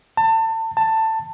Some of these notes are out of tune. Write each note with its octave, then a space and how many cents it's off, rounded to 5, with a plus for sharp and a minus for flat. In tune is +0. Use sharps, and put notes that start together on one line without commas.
A5 +30
A5 +15